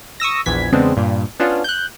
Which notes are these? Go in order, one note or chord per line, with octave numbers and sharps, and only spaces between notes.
C#6 D#6 E6 A#6
A#1 E2 E3 G#6 B6
E2 C#3 G#3 B3 C4 D4
G2 A#2
B3 C#4 D4 F4
F#6 G6